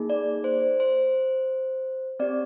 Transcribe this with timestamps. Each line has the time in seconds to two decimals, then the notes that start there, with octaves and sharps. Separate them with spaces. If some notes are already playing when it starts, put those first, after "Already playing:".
Already playing: A#3 D#4 G#4
0.10 D5
0.44 C5
0.80 C5
2.20 C4 G4 D5